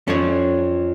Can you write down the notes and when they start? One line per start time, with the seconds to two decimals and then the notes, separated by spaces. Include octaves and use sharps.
0.08 F2 C#4 D4 A4 C#5